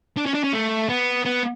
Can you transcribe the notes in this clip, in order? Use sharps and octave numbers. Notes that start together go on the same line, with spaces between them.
D4
C#4
D4
C#4
A3
B3
B3